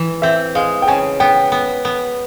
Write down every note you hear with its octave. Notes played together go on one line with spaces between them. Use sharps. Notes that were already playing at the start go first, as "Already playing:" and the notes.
Already playing: E3
C4 E5
G#3 F5
G5
C#3 G#5
B3 G5
B3
B3